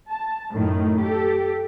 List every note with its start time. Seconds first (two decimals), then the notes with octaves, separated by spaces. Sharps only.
0.10 A5
0.54 F#2 A2 D#3
1.02 G4 A4